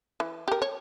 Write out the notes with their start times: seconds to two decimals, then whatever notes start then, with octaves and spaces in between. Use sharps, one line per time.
0.20 E3
0.48 G4 A#4
0.62 C#5